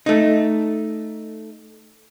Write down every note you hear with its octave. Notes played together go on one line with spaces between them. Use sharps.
A3 D#4